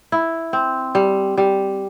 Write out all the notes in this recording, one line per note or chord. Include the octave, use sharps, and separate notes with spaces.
E4
C4
G3
G3